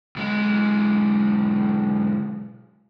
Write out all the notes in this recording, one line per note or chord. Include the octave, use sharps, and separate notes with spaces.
B1 G#3